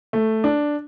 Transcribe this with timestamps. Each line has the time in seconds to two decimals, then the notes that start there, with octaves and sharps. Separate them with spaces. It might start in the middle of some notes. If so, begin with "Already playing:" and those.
0.13 A3
0.44 D4